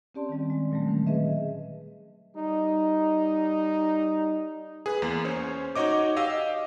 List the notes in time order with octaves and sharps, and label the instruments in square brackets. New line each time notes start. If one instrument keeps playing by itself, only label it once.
[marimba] C4 C#4 G4 D5 A5 C6
D#3 G3
G#3
A#2 F#3 G3 A3
D3 D#3 C#4
G#4 B4 D#5 E5
[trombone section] G3 D#4
[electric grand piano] G#4 B4
E2 A#3
C#4 C5 C#5
D#4 F#4 C#5 D#5 D6
G4 D#5 F5 E6